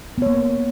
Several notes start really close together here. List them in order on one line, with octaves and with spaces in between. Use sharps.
B3 C#5 A#3